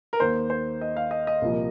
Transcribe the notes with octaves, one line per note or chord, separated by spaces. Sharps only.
A#4
D#2 D#3 A#3 C5
C5
D#5
F5
D#5
D#5
C2 A#2 F3 A#3